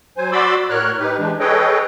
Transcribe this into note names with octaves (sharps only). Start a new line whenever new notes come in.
F#3 C5 G#5
F#4 D5 B5 C6 D6 E6
A2 A#4 C#5 F6 F#6
D#4 G4 B4
E3 G#3 D4
G#4 A4 B4 C#5 D#5 G5